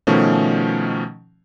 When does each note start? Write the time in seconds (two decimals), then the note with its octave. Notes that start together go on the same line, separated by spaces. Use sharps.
0.07 B2 D#3 F3 A3 C#4